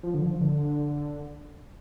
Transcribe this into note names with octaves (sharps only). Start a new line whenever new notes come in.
F3
D3
F3
D3